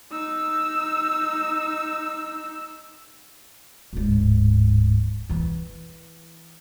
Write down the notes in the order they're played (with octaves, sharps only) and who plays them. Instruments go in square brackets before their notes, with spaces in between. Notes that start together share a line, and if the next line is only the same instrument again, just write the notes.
[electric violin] D#4 E6
[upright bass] D1 G#2
E3 E4